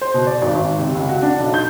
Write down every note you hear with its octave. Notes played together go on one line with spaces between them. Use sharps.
C5
B2
D5
G#1
G#1
C3
C#2
F#4
D4
B1
G6